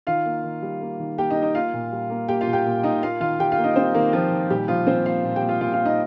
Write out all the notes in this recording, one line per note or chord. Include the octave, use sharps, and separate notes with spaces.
D#3 F4 F5
A#3
D#3
G3
A#3
D#3
A#3 G4 G5
D#4 D#5
A#3
D#4 D#5
A#3 F4 F5
A#2
G3
A#3
A#3 G4 G5
F4 F5
A#2
G4 G5
A#2
A#2 D#4 D#5
A#3 F4 F5
D#3 F4 F5
D#3 G4 G5
F4 F5
A#3
D#4 D#5
G3 C4 C5
D#3 A#3 A#4
F3 A#3 F4
D#3
A#2 G3 G4
A#2 F3 F4
A#2 C4 C5
A#3 F4 F5
A#2
G4 G5
A#2
F4 F5
A#2 F4 F5
F4 F5
A#3
D#4 D#5